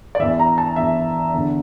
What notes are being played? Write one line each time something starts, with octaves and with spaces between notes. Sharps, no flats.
D5
E2 E3 E5
A#5
A5
E2 E3 E5
E2 D3